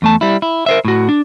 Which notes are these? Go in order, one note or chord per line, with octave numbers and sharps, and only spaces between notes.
E2 A3 A5
G3 E4
E4
A#4 C5 E5
A2 F#4
D4